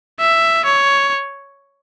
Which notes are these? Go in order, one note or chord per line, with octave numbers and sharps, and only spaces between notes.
E5
C#5